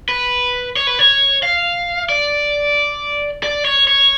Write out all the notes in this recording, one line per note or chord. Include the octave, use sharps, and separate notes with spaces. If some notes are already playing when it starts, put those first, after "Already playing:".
B4
C#5
B4
C#5
F5
D5
D5
C#5
C#5